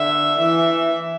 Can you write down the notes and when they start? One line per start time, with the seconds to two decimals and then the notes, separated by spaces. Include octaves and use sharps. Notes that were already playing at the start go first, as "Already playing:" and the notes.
Already playing: D3 E5
0.40 E3 E5